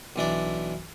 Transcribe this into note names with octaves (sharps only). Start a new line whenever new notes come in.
B1 E3 D4 D5